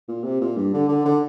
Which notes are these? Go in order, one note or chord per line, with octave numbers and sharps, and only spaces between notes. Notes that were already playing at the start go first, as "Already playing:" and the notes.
A#2
C3
A#2
G2
D3
D3
D3